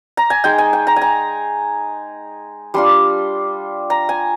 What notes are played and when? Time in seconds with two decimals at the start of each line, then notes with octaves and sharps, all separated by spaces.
0.17 A#5
0.30 G#5
0.44 G#3 D#4 G5
0.58 G#5
0.73 G5
0.87 A#5
0.96 G#5
1.02 A#5
2.74 G3 D4 F4 C6
3.90 A#5
4.09 G#5